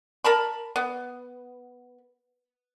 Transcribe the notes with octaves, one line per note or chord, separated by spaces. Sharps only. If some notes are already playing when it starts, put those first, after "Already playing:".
A#4 A5 B5
B3